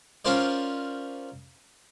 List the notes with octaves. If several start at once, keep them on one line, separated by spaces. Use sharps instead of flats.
C#4 F4 A#4 C5 D5